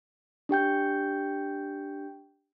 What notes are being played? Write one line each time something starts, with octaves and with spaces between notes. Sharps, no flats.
D4 G4 G5 G6